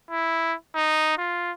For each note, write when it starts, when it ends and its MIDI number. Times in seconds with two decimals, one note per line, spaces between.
0.11 0.55 64
0.76 1.18 63
1.18 1.52 65